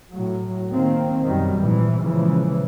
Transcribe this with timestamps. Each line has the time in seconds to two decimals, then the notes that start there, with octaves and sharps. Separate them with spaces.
0.13 A2 F#3
0.72 D#3 A#3 C4
1.27 F#2 B2 D#3 F#3 G3
1.59 G#1 A#2 E3 F3
2.01 A#2 C#3 E3 F3 G#3